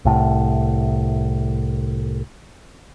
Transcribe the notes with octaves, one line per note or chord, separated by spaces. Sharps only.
C2 A2